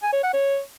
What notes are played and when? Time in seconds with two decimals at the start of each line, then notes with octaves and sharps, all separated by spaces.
0.03 G#5
0.13 C#5
0.23 F#5
0.33 C#5